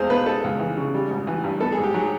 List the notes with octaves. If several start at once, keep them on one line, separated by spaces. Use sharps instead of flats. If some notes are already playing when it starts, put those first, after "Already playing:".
Already playing: E2 G#3 C4 C5 F5
B2 B4
G#3 A4
C#2
E3
C#3
G3
G#1
E3
G2
B3 A4
G#4
G#2
G4
F#3 G#4